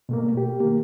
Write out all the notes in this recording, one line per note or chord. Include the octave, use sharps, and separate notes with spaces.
B2 A3 A#3
G4
D#3 A#3